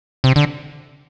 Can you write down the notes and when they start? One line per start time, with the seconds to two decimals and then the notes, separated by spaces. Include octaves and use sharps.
0.24 C3
0.36 D3